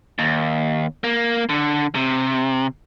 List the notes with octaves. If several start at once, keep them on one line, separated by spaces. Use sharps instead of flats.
D#2
A#3
D3
C3